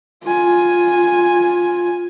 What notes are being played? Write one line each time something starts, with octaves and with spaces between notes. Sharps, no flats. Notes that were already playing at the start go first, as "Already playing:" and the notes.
F4 G#5